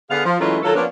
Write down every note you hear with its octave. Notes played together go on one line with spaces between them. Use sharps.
D3 B3 G#4 F5
F3
E3 F#3 G#3 A3 C#4 F4
D#3 F#3 F4 A4
F3 A#3 B3 C#4 D4